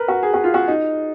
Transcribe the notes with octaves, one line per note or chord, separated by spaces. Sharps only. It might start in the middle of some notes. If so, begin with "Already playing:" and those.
Already playing: A#4 B4
F#4
G#4
F#4
F4
F#4
D#4